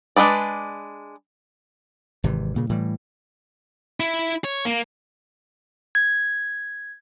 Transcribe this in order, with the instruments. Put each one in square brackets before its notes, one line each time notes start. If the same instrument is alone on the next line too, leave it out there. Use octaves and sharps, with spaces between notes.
[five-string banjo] G#3 A3 D4 B4 D5
[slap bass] G#1 C3 E3
G2 A#2 C#3
A2 E3 G3
[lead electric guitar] E4
C#5
A#3
[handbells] G#6